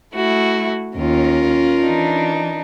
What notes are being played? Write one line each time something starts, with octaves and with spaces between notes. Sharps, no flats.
A3 E4 F#4
D#2 C#4 F4 A#4
E3 D4 D#4